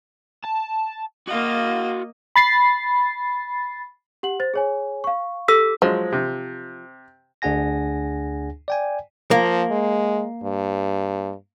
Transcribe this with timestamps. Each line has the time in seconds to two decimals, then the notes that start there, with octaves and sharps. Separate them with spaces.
0.45 A5
1.28 A#3 F#4 D#5 F5
2.36 B5 A6 C7
4.23 G4 F#5 F#7
4.40 C5 A6
4.54 G#4 C#5 G#5
5.04 F5 C#6
5.48 G4 A4 E6 B6
5.82 F3 F#3 G#3
6.12 C3
7.42 D2 D4 G#4 F#5 G#5 A#6
8.68 D5 G5 G#5
9.31 F3 A#3
9.70 G#3
10.43 G2